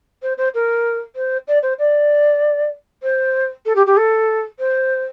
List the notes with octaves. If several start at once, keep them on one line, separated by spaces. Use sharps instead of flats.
C5
C5
A#4
C5
D5
C5
D5
C5
A4
G4
G4
A4
C5